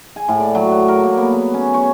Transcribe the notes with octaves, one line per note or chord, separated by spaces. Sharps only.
G#5
A2
D5
F#3
F#5
A#4
A#3
B3
B3
C#4
C#5